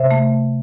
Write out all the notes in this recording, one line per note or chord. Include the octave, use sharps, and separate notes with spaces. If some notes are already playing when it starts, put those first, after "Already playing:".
Already playing: C3 C5 E5
A3